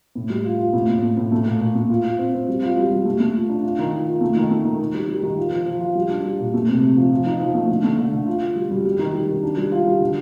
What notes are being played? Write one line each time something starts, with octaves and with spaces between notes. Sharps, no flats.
A2
G3
F4
F4
A2
A2
A3
A2
A3
A#2
A#2
A3
F4
F4
C4
C4
G3
F4
G3
G3
A3
A3
F4
D4
F4
D#3
F4
F4
A3
D#3
A3
D#3
D#3
G3
G3
D#3
F4
F3
F3
F4
G3
D4
G3
A#2
A3
C3
C3
F3
F3
D#4
F3
A3
D3
A3
D3
D3
F4
F4
G3
G3
G3
D#3
G3
D#3
D4
G3
F4
G3
D3